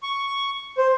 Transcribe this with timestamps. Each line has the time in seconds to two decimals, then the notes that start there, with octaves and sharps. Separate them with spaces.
0.03 C#6
0.78 C5